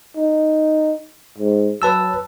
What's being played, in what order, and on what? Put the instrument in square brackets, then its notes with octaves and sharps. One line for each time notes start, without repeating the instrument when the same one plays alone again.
[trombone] D#4
G#2
[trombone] F#3 [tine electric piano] B4 A5 E6